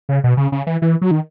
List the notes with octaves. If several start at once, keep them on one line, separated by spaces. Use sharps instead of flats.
C#3
B2
C#3
C#3
E3
E3
F#3
D#3